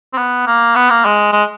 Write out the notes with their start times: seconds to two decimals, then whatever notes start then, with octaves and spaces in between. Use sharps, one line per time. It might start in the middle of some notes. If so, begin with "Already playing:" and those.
0.13 C4
0.18 B3
0.47 A#3
0.76 B3
0.90 A#3
1.05 G#3
1.33 G#3